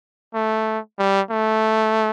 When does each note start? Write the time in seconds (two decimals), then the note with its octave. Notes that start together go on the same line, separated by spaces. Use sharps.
0.34 A3
0.99 G3
1.30 A3